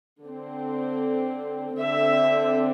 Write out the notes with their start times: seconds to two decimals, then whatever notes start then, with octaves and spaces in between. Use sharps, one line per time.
0.23 D3 C4
1.80 D3 C4 E5